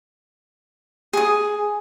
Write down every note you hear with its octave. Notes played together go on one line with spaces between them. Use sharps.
G#4 D#6